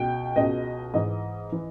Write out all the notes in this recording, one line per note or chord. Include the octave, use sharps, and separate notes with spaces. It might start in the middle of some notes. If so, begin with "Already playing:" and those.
Already playing: C#2 B2 G5
C#2 B2 D#5
G#2 E3 D#5
E3